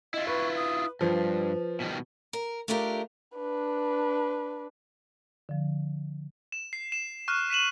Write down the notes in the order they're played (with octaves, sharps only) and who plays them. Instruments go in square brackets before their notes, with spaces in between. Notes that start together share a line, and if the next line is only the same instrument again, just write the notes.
[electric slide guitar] E4 F4 [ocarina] D#5
[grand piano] B4 [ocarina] C#6
[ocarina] D#6
[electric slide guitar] G2 [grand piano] F3 [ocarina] B4
[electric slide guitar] B2 D#3 G3
[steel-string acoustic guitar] A#4
A3 D4 F4 G4 A#4
[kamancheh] D4 B4
[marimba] D3 F3
[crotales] E7
C7
E7
C#6 F6 F#6
B6 D#7 E7 F#7